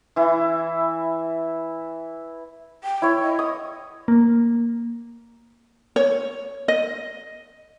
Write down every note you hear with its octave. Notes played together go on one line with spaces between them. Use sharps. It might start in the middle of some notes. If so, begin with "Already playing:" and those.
E3 E4
G5
E4 C#5
D#5
D#6
A#3
C#5
D#5